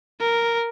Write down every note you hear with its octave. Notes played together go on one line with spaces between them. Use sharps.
A#4